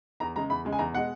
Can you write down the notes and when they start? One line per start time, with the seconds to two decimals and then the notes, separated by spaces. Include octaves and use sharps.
0.20 E2 A#5
0.36 C#3 G#3 A#5
0.50 E2 B5
0.65 C#3 G#3
0.72 G#5
0.79 E2 A#5
0.93 B2 G#3 F#5